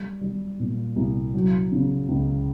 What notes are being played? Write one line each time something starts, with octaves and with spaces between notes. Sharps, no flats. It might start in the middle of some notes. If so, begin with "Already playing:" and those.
Already playing: G3
G3
A#2
C2
F#3
C#3
C#2